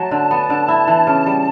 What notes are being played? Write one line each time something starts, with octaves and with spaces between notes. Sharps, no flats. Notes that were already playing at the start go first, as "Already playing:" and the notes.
Already playing: F#3 A3 A5
D3
B3
D3
E4
E3
C#3
G3